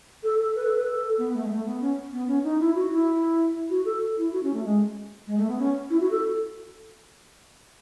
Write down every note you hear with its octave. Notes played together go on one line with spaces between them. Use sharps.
A4
A4
B4
A4
B4
A4
B3
A3
G#3
A3
B3
C#4
B3
C#4
D#4
E4
F#4
E4
F#4
A4
E4
F#4
C#4
A3
G#3
G#3
A3
B3
C#4
E4
F#4
A4